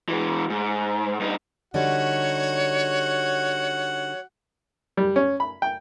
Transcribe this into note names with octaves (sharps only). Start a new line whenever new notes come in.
E3 G#3
G#2
G2 D#4
D3 G3 D#4 F#4 C#5 F#5
G3
C#4
B5
G5